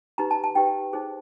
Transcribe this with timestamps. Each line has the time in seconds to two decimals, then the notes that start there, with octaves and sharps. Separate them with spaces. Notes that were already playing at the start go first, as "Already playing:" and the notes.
0.18 D#4 G4 B4 A#5
0.31 A5
0.44 A5
0.55 D#4 G4 B4 G5
0.93 D#4 G#4 C5